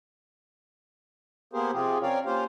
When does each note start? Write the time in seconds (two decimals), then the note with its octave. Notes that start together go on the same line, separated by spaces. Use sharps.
1.53 A#3 B3 G4 G#4 A#4 C5
1.73 C3 F3 C4 F4 G4 G#4
2.02 C4 C#4 A#4 C#5 D5 F5
2.25 A#3 C#4 F4 G4 C5 F5